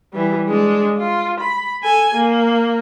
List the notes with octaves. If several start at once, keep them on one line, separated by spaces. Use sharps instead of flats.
E3 G3
G#3 D4
F4
B5
A4 G#5
A#3